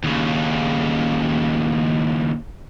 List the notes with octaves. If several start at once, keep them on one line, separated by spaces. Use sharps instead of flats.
D#2 C#3